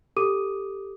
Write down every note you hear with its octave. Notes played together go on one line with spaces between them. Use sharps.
G4 A4 D6 D#6 D#7